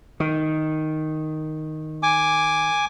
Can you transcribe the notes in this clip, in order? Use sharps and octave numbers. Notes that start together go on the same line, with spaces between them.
D#3
G#5 D6